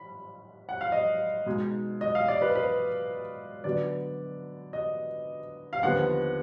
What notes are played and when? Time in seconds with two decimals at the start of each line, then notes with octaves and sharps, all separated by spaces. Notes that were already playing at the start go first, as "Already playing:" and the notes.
Already playing: B5
0.69 F#5
0.81 F5
0.92 D#5
1.46 B2 G#3 D#4
2.01 D#5
2.15 F5
2.28 D5
2.42 B4
2.55 B4
3.64 D3 F#3 B3 D5
4.73 D#5
5.73 F5
5.83 D#2 D3 F3 B3 F#5